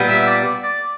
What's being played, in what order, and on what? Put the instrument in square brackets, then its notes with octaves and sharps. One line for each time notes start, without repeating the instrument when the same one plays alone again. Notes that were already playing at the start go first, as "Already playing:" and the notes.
Already playing: [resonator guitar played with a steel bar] A#2 G3 B3
[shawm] E5
D5
D5